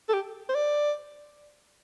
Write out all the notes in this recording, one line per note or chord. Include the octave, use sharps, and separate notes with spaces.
A4
G4
C5
D5